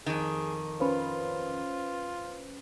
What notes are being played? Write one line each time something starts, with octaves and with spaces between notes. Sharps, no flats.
F2 D#3 G#4
C#4 F4 B4 C5